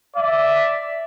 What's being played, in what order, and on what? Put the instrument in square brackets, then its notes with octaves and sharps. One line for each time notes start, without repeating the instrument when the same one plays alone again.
[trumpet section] D5 E5